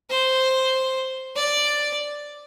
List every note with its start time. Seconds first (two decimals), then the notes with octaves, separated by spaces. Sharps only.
0.11 C5
1.36 D5